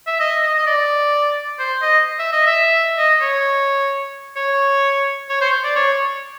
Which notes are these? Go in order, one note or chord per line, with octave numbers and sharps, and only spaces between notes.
E5
D#5
D#5
D#5
D5
C5
D#5
E5
D#5
E5
D#5
C#5
C#5
C#5
C5
D5
C#5